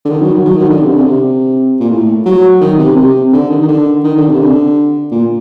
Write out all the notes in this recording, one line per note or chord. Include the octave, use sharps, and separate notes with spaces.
D3
D#3
F#3
D#3
F#3
D#3
D3
C3
D3
C3
A#2
A2
F#3
D#3
C3
C3
D3
D#3
D#3
D3
D#3
D3
C3
D3
A#2